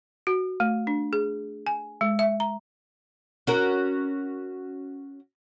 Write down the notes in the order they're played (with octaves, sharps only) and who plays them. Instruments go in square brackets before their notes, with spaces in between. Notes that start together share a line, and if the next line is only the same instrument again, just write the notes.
[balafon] F#4
A3
D4
G#4
G#5
G#3
E5
A#5
[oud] C#4 F#4 A#4